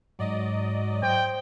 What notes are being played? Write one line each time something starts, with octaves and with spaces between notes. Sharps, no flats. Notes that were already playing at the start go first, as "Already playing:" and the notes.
G#2 F#3 D5 D#5
C5 G5